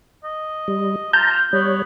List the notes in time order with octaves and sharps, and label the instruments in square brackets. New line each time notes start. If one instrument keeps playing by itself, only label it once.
[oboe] D#5
[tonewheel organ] G3
[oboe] F4 [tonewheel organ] A5 A#5 [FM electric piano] G6
[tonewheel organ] G3 C#5 [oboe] B3